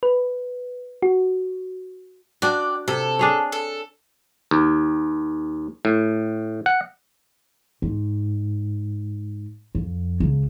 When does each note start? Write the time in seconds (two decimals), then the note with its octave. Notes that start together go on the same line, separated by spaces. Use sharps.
0.03 B4
1.02 F#4
2.42 D4 F#4 D5 G5
2.88 C3 A4
3.19 D4 G#4 C#5
3.52 A4
4.51 D#2
5.85 A2
6.66 F#5
7.82 G#2
9.75 F2
10.20 C#2